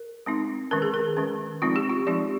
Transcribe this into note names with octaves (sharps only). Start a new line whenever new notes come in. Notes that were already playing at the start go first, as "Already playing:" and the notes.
Already playing: A#4
G#3 C4 D#4
D#3 G#3 C#4 A#4
G#4
A#4
D#3 G#3 C#4
F3 G#3 C4 D#4 F4
G4
F4
F3 G#3 C4 D#4 G4